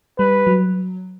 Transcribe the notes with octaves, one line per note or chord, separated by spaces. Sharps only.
G3 B4
F#3